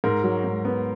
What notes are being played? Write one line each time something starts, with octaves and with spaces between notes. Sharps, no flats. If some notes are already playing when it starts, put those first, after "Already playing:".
G#2 A#4
F#3
G#2
B3